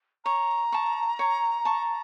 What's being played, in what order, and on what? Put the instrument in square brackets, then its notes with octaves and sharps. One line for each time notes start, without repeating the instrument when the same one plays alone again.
[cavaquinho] C#5 [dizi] A#5
[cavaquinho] A5 C#6
C#5
A5 C#6